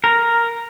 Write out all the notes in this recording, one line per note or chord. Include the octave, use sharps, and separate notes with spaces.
A#4